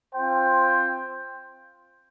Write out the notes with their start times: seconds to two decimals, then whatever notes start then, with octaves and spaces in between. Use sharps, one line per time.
0.13 C4 F4 C5 G5